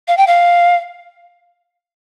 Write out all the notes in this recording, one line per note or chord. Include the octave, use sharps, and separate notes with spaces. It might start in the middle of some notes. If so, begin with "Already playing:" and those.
F5
G5
F5